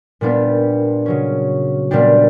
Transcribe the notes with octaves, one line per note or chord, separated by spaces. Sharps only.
A#2 G3 B3 D4 G4
C#3 F#3 C#4
A#2 G3 B3 D4 G4